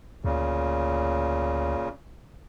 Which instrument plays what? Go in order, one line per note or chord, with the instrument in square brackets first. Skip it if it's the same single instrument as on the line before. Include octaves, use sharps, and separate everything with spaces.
[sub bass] D2 [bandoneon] A#2 C#3